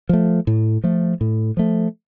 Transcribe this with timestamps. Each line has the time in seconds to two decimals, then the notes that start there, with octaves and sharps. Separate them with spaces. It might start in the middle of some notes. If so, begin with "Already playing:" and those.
0.09 F3 A3
0.47 A2
0.84 F3 A3
1.21 A2
1.57 F3 A3